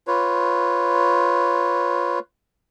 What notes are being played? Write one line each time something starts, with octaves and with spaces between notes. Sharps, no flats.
F4 B4 C#5